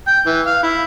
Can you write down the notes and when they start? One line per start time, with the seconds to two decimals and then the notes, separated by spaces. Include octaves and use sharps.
0.07 G5
0.26 E3
0.46 F5
0.63 E4